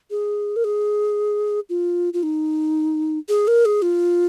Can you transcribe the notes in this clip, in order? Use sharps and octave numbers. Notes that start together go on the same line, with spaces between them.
G#4
A#4
G#4
F4
F4
D#4
G#4
A#4
G#4
F4